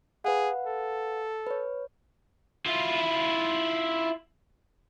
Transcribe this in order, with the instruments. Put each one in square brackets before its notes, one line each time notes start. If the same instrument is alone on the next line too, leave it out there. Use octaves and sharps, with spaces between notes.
[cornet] G#4 [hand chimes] B4 F5 F#5
[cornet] A4
[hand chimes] B4 C#5
[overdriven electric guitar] E4 F4